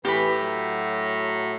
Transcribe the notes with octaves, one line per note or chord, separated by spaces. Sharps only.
A2 E3 G4 B5
F#3